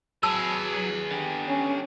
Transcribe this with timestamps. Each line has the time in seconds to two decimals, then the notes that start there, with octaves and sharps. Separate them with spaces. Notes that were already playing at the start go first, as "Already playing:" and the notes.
0.23 F#3 G#4 B4 A5 E6
1.11 D3 G4
1.48 C#4